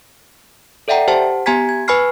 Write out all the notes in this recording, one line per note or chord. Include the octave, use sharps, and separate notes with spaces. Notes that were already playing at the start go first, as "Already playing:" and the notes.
A4 D5 E5 F#5 G5 A#5
G4 C5 F#5 A5
B3 G4 G#5 A#5 G#6 B6
G#6
B4 G#5 B5 C#6 F6 C7